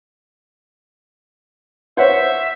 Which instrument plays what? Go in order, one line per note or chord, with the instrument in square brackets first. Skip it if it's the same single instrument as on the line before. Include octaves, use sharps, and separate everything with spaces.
[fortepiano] C5 C#5 F#5 [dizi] E5